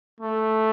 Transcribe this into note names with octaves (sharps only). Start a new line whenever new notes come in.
A3